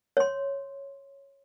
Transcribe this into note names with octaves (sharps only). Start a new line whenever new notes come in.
C#5 C6